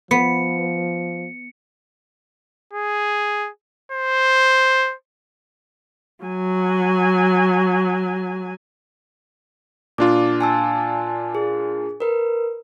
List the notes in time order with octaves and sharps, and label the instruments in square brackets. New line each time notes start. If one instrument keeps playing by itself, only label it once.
[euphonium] F3 [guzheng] B3 [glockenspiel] C#7
[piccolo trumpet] G#4
C5
[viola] F#3 G#5
[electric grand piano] A#2 D4 F4 [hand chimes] D6
[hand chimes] G#5 A5 E6
G#4
A#4 B4